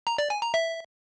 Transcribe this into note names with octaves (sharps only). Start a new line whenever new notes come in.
A#5
D5
G#5
A#5
E5